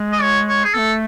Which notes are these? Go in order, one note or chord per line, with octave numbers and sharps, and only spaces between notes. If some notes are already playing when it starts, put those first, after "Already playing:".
Already playing: G#3
D#5
C#5
C#5
G#4
A3 B3 A4